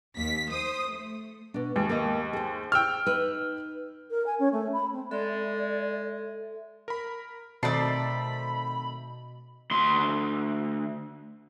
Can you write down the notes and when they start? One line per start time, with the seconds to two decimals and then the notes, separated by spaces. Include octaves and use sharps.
0.17 D#2 B6
0.50 C5 D#6
0.91 A3
1.54 B2 D4
1.76 D#2 G#3
1.89 A#3 D#5
2.33 G#4 C5
2.72 G5 E6 F6
3.06 D#4 B4
4.10 A#4
4.26 G#5
4.39 C#4
4.52 A3
4.73 B5
4.93 C4
5.11 G#3 A4 D5 E5
6.88 A#4 B5
7.63 B2 D#3 A3 C4 D5 A5 B5 C7
9.71 D2 C6